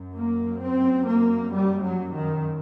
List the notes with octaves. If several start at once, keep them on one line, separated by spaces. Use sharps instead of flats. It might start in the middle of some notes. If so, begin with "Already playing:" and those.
Already playing: F#2
A#3
C4
A#3
G3
F#3
D#3